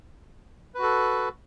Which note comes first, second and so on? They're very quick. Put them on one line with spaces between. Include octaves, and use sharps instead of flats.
B4 F#4 A4